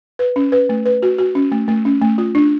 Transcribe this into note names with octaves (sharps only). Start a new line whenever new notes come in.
B4
C#4
B4
A3
B4
F#4
F#4
C#4
A3
A3
C#4
A3
F4
D4